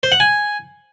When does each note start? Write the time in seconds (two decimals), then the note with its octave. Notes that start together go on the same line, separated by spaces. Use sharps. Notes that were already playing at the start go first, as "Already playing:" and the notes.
0.03 C5
0.12 F#5
0.20 G#5